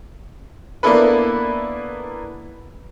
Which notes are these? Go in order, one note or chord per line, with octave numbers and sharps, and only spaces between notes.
A#3 B3 D4 E4 A4 B4